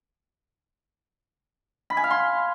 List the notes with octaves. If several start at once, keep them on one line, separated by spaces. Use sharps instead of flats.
B5
G#5
F5
C6